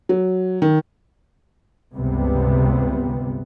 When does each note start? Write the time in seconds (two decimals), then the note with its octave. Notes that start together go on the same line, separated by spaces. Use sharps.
0.09 F#3
0.62 D#3
1.95 G1 C#2 C3 G3 B3